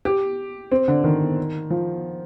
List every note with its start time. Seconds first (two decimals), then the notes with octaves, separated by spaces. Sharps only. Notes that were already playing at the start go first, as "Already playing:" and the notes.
0.05 G4
0.72 C4
0.88 D3
1.04 D#3
1.70 F3